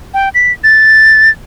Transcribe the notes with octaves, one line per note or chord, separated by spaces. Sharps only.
G5
B6
A6